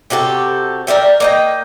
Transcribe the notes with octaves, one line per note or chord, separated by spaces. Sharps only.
C3 F#4 G4 A4
A#4 D5 E5 G5
A#3 D#5 G5